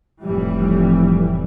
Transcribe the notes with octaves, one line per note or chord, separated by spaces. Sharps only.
F1 A2 E3 G3